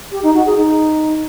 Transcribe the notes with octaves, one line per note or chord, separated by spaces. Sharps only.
G4
D#4
F#4
G#4
D#4